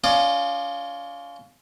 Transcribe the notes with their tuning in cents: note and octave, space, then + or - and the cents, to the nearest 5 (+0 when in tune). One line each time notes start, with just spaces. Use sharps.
C#4 +35 F4 +0 D5 +40